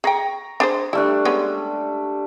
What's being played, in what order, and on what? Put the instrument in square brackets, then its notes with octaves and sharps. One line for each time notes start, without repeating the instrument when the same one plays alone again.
[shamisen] G#4 G5 [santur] A#5 C#6
[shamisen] D4 G#4 C5
[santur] G3 A3 D4 [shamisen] E4
[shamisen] G#3 B3 C#4